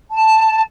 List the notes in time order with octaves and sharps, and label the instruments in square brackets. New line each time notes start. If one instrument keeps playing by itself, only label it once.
[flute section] A5